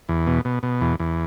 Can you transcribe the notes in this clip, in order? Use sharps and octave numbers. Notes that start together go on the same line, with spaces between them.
E2
B2
B2
B2
E2
E2